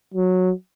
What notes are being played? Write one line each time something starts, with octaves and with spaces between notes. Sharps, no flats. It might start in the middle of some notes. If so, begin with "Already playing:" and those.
F#3